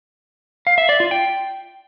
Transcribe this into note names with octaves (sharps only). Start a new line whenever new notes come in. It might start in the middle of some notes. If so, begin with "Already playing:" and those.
F5
E5
D5
F4
G5